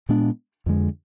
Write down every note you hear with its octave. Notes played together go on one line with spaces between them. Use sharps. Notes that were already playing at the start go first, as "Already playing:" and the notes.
A#2 G#3 B3 D4
F2 D3 G#3